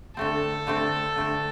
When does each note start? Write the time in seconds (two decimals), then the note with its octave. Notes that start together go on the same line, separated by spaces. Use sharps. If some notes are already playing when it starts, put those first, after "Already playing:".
0.17 D3 A3 C4 A4
0.67 D3 A3 C4
1.16 D3 A3 C4